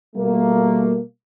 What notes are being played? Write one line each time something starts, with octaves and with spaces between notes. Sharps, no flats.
B2 G3 A3 A#3